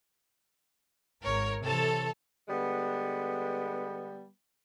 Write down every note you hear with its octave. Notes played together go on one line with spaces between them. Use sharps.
G#1 A#4 C#5
C3 E3 A4 C#5 A5
D3 G3 G#3 B3